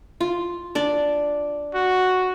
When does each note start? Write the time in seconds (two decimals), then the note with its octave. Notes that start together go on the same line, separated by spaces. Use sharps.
0.21 F4
0.75 D4 D5
1.75 F#4